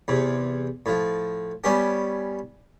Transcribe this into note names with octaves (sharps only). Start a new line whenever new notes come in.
E2 C3
A2 F3
G3 B3 C#4 G4